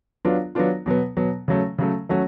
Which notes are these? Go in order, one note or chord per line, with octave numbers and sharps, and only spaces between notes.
F#3 B3 D4 F4
F#3 B3 D4 F4
B2 F#3 B3
B2 F#3 B3
C#3 F#3 A3
C#3 F#3 A3
F#3 A3 C#4 F#4